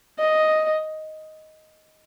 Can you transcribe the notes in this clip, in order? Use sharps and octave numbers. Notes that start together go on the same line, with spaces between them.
D#5